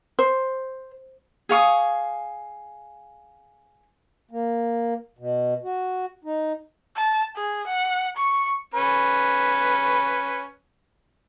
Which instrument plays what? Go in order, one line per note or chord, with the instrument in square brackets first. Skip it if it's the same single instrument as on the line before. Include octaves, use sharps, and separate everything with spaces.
[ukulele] C5
[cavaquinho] G#4 F5 C#6 D#6
[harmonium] A#3
B2
F#4
D#4
[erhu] A5
G#4
F#5
C#6
[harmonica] C#4 B4